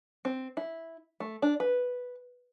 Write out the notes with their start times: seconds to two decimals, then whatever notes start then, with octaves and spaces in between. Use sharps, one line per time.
0.25 C4
0.57 E4
1.20 A3
1.42 D4
1.60 B4